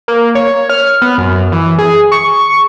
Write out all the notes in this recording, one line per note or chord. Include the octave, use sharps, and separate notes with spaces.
A#3
C#5
F6
B3
F#2
E3
G#4
C#6